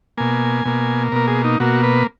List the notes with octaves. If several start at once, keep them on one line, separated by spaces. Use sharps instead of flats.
B2 A#3 G#5
B2 A#3
B2 A#3 A#4
G#4
D#4
B2 A#3 F#4
B4